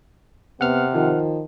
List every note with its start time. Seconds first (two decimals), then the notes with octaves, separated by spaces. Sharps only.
0.61 C3 B3 F#5 F6
0.94 D#3 F3